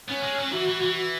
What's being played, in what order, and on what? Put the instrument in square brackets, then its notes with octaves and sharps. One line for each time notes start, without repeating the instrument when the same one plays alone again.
[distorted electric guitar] B3 [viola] C#4
[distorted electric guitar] G#3
F#3
[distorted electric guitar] E3 [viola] F#4
[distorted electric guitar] E3
E3